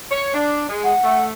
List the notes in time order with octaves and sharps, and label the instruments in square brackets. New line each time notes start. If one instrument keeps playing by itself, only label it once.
[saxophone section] C#5
D4
G#3
[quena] F#5
[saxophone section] A3